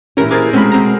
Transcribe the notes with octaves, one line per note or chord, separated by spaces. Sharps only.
A#2 E3 C#4 G4 A#4
G#4 A#4 C5 D6 G#6 A6
B2 G#3 A3 C4 C#4 B5
C4 A#5